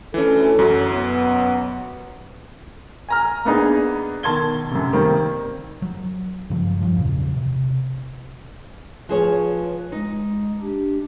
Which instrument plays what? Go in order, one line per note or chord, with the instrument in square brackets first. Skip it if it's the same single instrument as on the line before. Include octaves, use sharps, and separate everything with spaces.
[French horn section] D2 A4 [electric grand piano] E3 C#4
[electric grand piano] F#2 F#3
[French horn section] B2 B3
[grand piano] G#5 A#5 F6
A#3 B3 D4 D#4 G#4
B1 D#3 A5 C6 G#6 G7
F#2 C3
D#3 G3 A#3 C4
[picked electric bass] F#3
G2 C#3 F3 F#3
G2 F3
E2 A#2 C#3
C3
[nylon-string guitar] F3 G#4 C#5 [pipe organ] B4
[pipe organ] G#3 [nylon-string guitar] D#4
[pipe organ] D4 G4